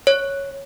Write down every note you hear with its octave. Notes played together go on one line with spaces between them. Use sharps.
C#5